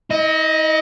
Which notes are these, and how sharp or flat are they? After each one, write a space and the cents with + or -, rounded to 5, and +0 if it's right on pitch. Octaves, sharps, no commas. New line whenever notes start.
E4 -45 D#5 +0